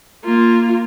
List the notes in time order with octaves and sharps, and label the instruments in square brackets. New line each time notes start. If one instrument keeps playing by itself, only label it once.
[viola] A#3 F4